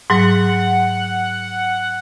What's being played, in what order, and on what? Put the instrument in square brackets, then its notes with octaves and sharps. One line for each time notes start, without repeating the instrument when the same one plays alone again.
[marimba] G#2 F#3 [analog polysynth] F#5